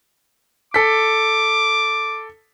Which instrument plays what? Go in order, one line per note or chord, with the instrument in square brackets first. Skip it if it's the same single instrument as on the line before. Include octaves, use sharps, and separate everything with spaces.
[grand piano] A4 B6 [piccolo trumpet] D6